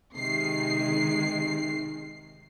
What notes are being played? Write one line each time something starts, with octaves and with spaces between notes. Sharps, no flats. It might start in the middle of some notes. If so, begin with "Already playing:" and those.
C3 D#3 G#3 C7